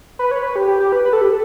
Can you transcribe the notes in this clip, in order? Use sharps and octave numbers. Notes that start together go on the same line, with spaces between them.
B4
C#5
B4
G4
G4
G4
B4
B4
A4
G4
A4